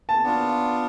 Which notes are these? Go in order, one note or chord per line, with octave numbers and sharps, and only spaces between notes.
A5
B3 D4 F4